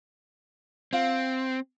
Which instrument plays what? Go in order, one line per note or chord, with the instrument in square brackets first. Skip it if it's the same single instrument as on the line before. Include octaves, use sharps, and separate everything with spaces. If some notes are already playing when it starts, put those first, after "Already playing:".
[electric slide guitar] C4 [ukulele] F4 F5 F#5